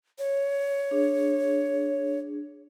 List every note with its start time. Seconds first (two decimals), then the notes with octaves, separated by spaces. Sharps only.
0.19 C#5
0.91 D4 G#4